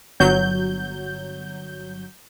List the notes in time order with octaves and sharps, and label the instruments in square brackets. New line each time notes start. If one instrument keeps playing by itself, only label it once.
[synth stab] G1 F#3 G6